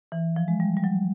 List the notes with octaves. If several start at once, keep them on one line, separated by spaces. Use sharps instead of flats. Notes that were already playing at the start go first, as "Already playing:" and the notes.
E3
F3
G#3
G3
G3
F#3